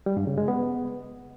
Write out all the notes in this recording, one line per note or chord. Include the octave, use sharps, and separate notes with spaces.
G3
G2
C#3
G#3
B3